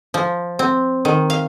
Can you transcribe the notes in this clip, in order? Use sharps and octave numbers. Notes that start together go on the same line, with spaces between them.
F3
C4
D#3
F5